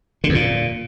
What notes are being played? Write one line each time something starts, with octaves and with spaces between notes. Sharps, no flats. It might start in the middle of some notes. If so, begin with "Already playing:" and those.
D3
E2
A#2